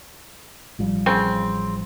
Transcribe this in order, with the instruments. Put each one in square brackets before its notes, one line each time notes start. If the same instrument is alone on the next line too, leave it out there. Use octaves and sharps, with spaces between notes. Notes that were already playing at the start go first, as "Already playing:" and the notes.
[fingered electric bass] A1 F3 G3
[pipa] C#3 C4